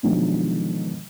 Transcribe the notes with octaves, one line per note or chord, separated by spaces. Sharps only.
B2 D3 D#3 F3 F#3 G#3